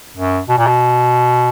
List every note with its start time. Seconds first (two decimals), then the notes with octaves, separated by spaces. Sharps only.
0.17 F#2
0.49 B2
0.58 A#2
0.67 B2